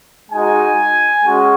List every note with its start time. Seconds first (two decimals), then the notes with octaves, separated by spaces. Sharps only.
0.31 G#3 D#4 F#4 G#5
1.25 G#3 C#4 F#4